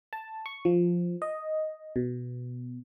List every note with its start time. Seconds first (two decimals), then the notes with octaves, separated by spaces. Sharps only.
0.13 A5
0.46 C#6
0.65 F3
1.22 D#5
1.96 B2